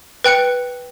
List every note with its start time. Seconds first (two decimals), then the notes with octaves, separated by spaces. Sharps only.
0.24 B4 G5 F#6 C#7